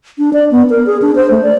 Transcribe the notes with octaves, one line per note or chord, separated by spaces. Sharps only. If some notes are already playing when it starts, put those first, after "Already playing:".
D4
D5
B3
A#4
G#4
D4
C5
A3
D5